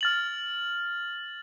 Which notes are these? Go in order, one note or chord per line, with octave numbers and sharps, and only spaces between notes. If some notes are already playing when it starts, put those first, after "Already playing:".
F6 A6 F#7